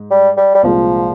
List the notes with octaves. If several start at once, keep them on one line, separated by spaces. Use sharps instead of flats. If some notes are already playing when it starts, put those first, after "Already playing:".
Already playing: G#2
G3
G3
G3
C2 A#2 F3 G#3